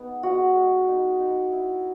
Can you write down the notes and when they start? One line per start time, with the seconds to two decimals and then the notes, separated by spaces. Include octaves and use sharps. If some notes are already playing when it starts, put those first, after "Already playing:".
Already playing: B3 D#4 G#4
0.23 G#3 F#4
0.56 G#3
0.88 D#4
1.20 D#4
1.52 E4